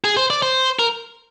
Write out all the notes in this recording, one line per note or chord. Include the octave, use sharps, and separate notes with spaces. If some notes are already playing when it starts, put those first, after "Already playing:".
G#4
C5
D5
C5
A#4